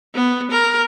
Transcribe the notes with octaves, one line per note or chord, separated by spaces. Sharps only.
B3
A#4